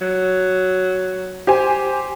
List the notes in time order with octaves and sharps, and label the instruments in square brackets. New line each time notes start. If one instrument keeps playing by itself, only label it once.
[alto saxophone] F#3
[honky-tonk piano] G4 C5 G#5